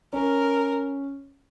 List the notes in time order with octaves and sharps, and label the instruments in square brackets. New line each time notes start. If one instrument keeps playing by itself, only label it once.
[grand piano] C#4 [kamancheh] A#4